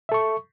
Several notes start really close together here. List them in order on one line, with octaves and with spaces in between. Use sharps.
E5 A4 C#6